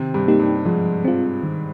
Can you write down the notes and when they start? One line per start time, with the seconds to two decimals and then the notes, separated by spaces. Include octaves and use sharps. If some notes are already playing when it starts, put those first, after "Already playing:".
Already playing: C3 D#3 C4
0.14 G2 G3
0.28 A#3 D#4 G4
0.40 G2 G3
0.65 G#2 F3 G#3
1.05 C4 F4
1.43 D#3